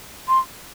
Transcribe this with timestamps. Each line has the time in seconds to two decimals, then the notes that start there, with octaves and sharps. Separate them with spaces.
0.28 C6